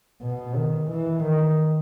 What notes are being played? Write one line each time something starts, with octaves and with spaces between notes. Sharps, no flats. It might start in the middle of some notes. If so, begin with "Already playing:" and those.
B2
D#3
E3
D#3